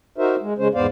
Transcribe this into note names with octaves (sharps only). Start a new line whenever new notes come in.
D#4 F#4 A#4 C5 E5
G#3
C#3 G#3 C#4 C5
E2 G#2 B3 C5 D5 F5